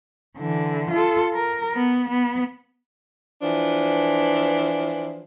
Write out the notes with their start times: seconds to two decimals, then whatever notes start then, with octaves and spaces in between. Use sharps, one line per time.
0.38 D3 E3
0.91 F4 A4
1.34 A#4
1.74 B3
2.09 B3
3.42 E3 F3 D4